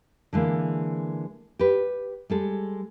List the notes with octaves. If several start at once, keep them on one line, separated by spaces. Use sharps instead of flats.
D3 E3 G#3 A#3
G4 B4
G3 G#3 A4